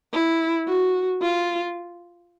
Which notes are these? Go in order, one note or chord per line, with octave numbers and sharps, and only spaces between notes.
E4
F#4
F4